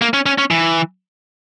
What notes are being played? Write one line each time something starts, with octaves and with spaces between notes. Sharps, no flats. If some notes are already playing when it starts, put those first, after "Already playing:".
A#3
C#4
C#4
C#4
E3